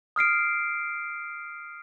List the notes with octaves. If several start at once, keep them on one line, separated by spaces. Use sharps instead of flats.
D#6 F6 C7 D7